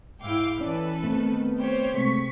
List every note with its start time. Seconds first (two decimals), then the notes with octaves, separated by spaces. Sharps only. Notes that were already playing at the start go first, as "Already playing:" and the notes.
0.20 G#2 E4 F5 G5 D6
0.61 E3 C#4 A4 B4 D5
1.03 D#3 A3 B3 C4
1.59 G4 C5 C#5
1.94 C3 G#3 A3 C4 C#6 B6